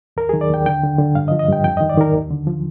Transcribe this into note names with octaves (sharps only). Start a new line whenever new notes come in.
D#2 A#4
D#3 G#4
D5
D#2 G5
D3 G5
D3
D3
G2 F5
D#5
F3
D#5
G2 G5
F2 G5
D#3 D#5
D5
D#3 A#4
D#2
D3
F3